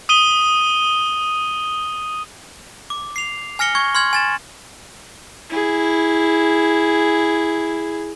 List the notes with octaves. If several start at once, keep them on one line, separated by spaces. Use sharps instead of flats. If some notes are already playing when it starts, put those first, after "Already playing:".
D#6 D#7 G7
D6
C7 F7
G#5 F6 A#6 C#7 G7
C#6 G#6
C6 F6 G#6 F#7
G#5 A6 E7
E4 G#4